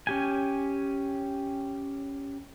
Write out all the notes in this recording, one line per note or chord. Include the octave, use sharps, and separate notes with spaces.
C#4 G4 G#5